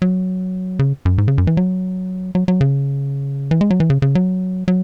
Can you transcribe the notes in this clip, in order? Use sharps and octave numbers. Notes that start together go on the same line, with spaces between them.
F#3
C#3
F#2
G#2
C#3
F#2
E3
F#3
F#3
F#3
C#3
E3
G#3
F#3
E3
C#3
C#3
F#3
F#3